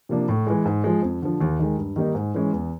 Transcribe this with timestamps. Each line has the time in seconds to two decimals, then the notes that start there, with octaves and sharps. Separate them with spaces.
0.09 C3 F3 A#3 D4
0.28 A2
0.47 E3 G#3
0.65 G#2
0.84 F3 G#3
1.02 F2
1.22 D3 F3
1.40 D#2
1.59 D#3 G#3
1.77 G2
1.96 D#3 G3 A#3 D#4
2.15 G#2
2.34 E3 G#3 C#4
2.53 E2